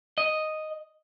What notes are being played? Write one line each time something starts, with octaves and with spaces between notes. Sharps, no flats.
D#5